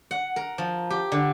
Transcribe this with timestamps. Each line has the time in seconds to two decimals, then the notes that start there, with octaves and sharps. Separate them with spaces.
0.11 F#5
0.36 A#4
0.58 F3
0.90 G4
1.12 D3